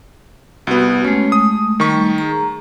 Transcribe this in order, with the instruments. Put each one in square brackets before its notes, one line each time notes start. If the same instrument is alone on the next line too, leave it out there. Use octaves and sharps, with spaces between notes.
[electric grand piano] C2 B3 [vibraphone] F#4
[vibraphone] G#3 A3 [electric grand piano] C#4
[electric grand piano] D#6
[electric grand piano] D#3 C#6 [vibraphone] G3 A3
[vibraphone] G#4 A#5